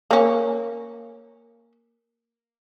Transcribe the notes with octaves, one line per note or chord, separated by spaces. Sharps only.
A#3 C#4